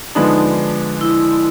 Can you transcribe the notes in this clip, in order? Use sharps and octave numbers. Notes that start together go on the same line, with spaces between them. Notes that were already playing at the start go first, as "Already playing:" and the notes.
D3 F3 G#3 B3 D4 D#4
E4